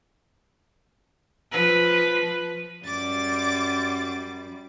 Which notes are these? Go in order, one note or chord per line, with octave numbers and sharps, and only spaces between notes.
F3 B4
F#2 G3 D6 A6